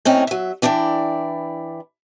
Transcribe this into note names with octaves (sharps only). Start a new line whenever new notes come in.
A2 C4 C#4 D#4
F#3 E5
E3 D4 E4 D5 G5